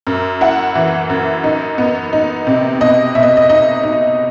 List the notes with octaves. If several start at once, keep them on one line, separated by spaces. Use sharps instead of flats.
F#2
E4 F#5
E3
F#2
D#4
B3
D#4
C3
B2 D#5
B2 E5
D#5
D#5
D#4 D#5
D#4